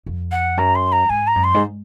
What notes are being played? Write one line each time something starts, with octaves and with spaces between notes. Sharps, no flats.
F2
F#5
F#2 A#5
C6
A#5
G#2 G#5
A#5
F#2
C6
G#2